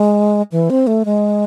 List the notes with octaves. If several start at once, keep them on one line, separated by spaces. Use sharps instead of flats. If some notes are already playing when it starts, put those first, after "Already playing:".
Already playing: G#3
E3
C4
A3
G#3